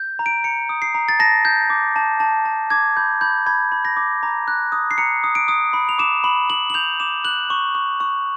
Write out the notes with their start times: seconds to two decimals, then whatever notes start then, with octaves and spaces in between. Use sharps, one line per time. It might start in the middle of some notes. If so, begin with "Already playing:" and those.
Already playing: G6
0.19 A#5
0.26 D7
0.44 A#5 C#7
0.69 D#6
0.82 C7
0.95 A#5
1.09 A6
1.19 A5 A#6
1.45 G6
1.70 D6
1.96 A5
2.20 A5
2.45 A5
2.70 D6 G#6
2.97 B5 G6
3.21 B5 G6
3.46 B5 G#6
3.72 B5
3.85 A#6
3.97 D6
4.23 A#5
4.48 F#6
4.72 D#6
4.91 C7
4.98 A#5 C#7
5.24 D#6
5.35 D7
5.48 D#6
5.73 B5
5.89 F7
5.98 D6 E7
6.24 B5 F#7
6.50 B5 F#7
6.70 F#7
6.74 G6 F7
7.00 D6 E7
7.24 F#6 F#7
7.50 C#6
7.75 C#6
8.00 C#6